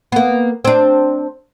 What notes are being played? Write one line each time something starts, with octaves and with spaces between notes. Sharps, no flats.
A#3 B3
C4 D4